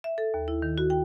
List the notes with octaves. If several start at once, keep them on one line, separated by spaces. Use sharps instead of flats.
E5
A4
D#2
E4
D#3
F#4
G5